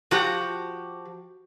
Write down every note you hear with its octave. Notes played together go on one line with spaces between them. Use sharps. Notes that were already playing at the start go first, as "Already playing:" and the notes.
F3 F#4 G4